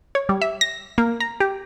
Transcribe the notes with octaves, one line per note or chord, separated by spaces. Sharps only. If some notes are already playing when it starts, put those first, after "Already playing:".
C#5
G3
E5
A#6
A#3
A#5
G4